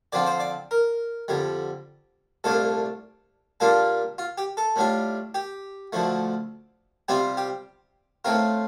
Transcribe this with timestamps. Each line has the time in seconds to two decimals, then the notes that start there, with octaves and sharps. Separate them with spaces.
0.12 D3 F3 C4 F4 D5
0.26 C5
0.40 D5
0.71 A#4
1.28 F2 D3 G3
2.44 C2 A#2 A3 D4 F4 A4
3.60 A#2 G3 A#3 D4 F4 A4
4.18 F4
4.38 G4
4.57 A4
4.76 A2 G3 D4 F4
5.35 G4
5.93 D2 D3 F3 A3
7.09 C3 G3 C4 F4 G4
7.37 G4
8.25 A2 A3 C4 F4 A#4